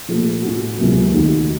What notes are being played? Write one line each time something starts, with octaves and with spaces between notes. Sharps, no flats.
A#2 F3 A3
A2 A3 C#4 F#4
C#2 C3 F#3 A#3
D#2 C#3 A3 D#4 F#4